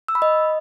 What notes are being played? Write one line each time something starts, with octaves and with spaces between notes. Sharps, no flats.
E6
B5
D#5